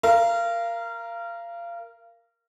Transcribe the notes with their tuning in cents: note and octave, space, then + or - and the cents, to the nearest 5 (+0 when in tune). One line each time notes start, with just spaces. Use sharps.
A#4 +0 F5 -25